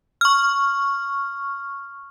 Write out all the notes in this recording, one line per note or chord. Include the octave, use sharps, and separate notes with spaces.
C#6 F6